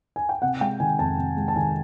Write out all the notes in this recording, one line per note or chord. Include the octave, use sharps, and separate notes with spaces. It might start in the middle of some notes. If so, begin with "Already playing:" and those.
G#5
G5
C3 F#5
G#3 G5
D#3 G#5
F2 A5
C3
G#3
A5
D#3 G#5